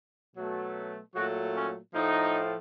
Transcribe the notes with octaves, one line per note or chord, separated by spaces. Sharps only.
B2 F#3 A3
A#2 F#3 A3 F#4
C#4
A2 F3 A3 D#4